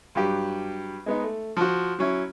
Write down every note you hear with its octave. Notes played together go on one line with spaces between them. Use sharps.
G2 F#3 G4
G#3 B3 D#4
A3
F3 F#4
F#3 C#4 E4